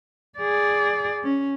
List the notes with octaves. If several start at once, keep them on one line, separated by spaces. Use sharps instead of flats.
G#4 D5
C#4